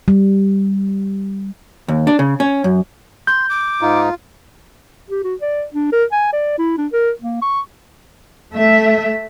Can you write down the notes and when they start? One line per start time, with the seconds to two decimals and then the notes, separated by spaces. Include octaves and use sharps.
0.08 G3
1.88 D#2
2.07 D4
2.19 C#3
2.40 C#4
2.64 F#2
3.27 C6 G6
3.50 D6
3.81 G#2 D#4 F4
5.10 G4
5.24 F#4
5.41 D5
5.74 D4
5.92 A#4
6.12 G#5
6.33 D5
6.58 E4
6.78 D4
6.92 A#4
7.22 A#3
7.42 C#6
8.54 A3 E5